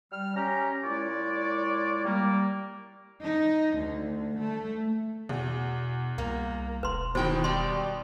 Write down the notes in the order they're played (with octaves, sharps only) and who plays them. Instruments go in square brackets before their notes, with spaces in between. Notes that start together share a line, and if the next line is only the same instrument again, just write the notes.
[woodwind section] G3 F6
C#4 G4 A#5
A#2 G#3 E4 C#5 D5
G3 A#3
[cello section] D#4
D2
A3
[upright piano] E2 [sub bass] B2
[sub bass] C2 [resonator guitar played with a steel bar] A#3
[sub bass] E1 [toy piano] B4 C6
[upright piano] B2 D#3 [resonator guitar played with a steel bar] E3 G5 [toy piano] C5
[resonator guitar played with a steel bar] G3 G4 [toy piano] C6